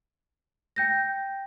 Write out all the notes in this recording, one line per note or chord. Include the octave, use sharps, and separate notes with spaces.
G5 G6 A#6